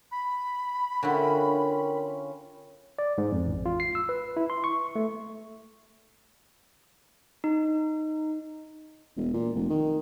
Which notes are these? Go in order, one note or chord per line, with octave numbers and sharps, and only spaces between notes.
B5
D3 C#4 E4 F4 A#4 C#5 G5
D5
G#2
F2
A1
F4
C7
E6
B4
E4
C6
C#6
A3
D#4
E1
A#2
F1
D#3